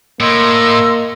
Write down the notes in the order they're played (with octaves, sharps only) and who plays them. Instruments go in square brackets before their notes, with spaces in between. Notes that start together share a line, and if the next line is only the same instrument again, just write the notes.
[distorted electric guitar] A2 [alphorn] A#3 [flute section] D#5 C6 E6